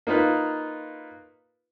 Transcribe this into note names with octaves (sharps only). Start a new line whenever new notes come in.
A#3 D#4 F4 B4